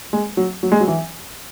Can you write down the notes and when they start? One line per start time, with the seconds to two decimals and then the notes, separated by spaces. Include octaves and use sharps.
0.13 G#3
0.37 F#3
0.63 F#3
0.72 G#3
0.80 F#3
0.88 E3